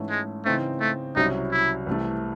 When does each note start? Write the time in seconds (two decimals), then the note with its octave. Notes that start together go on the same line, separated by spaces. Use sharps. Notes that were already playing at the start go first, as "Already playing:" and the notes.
Already playing: G#2 E3 A3 C#4 E4
0.10 G#3
0.45 C#3 E3 A3 C4 D#4
0.80 A3
1.16 C2 C3 F#3 C#4 D#4 E4
1.52 E4
1.87 C2 C3 E3 A3